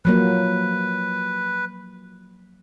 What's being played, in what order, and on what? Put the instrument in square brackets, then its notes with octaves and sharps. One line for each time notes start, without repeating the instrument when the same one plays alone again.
[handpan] F3 F#3 A#3 [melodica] B4